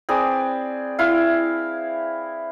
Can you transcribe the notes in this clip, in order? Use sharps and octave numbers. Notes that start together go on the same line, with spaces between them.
C4 G#4 B4 D5
E4 F5